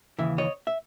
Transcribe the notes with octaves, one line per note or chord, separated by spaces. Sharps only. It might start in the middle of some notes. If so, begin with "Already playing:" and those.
D#2 C#3 E3 E5
C#5 D#5
E5